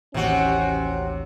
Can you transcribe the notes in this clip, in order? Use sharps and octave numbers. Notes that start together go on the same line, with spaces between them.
A1 D#2 C3 C#4 F#4